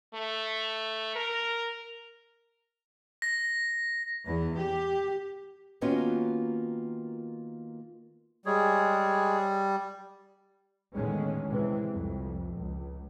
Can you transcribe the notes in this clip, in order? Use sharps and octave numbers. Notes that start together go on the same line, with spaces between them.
A3
A#4
A#6
E2
G4
D#3 A#3 B3 C#4 F4 F#4
G3 G#3 G#4 C#5
E2 A2 D3 D#3 G#3 C#4
C3 E3 G#3 C4
C2 F2
C#2